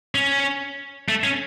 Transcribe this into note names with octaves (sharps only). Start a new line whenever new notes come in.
C#4
A3
C#4